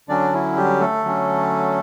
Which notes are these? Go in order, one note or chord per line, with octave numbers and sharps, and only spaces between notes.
D3 F#3 C#4 D4 D5
E4
G3 G4
A3 A4
D3 F#3 C#4